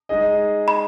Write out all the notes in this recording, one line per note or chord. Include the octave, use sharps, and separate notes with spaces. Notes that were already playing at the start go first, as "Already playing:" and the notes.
G#3 D#4 G#4 D#5
B5